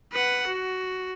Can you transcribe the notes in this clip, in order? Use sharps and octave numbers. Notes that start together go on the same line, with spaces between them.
B4 F#5
F#4